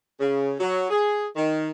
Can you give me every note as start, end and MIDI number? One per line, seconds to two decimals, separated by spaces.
0.20 0.53 49
0.60 0.87 54
0.90 1.25 68
1.36 1.70 51